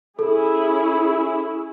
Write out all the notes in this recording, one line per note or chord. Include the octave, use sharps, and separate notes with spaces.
C#4 E4 G#4 A4